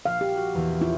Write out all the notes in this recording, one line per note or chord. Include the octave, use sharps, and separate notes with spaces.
A#1 F5 F6
G4
F#4
A#1 E2 E3
C#4 E4 F4 G4